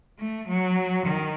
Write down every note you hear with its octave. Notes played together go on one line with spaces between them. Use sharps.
A3
F#3
D#3